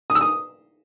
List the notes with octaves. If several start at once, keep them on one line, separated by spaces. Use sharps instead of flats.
D#6
E6
D#6